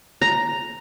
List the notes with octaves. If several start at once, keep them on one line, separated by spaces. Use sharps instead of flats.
A#5